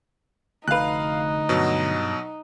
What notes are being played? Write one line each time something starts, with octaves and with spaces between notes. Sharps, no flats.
F1 D2 D#4 B4 F5 F#6
G2 B2 F#3